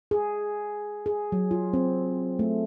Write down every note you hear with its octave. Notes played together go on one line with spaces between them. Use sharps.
G#4
G#4
F#3
F4
C4
A3